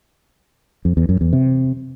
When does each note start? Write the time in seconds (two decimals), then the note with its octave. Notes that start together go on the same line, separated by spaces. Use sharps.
0.85 F2
0.97 E2
1.09 F#2
1.21 E2
1.33 C3